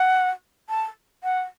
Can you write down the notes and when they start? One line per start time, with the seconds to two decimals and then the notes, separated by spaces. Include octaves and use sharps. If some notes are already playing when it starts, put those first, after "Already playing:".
Already playing: F#5
0.69 A5
1.24 F#5